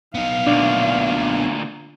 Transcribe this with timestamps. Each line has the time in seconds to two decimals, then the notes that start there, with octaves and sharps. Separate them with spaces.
0.15 B3 D#4 F5
0.47 D2 A#2 D4